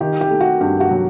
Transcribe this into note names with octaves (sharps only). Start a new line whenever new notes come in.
D#3 G4
G4
A3
F#4
G2 G4
F#4
F#3